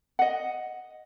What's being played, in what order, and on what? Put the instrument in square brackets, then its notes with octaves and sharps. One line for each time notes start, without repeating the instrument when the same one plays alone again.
[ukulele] D#5 F#5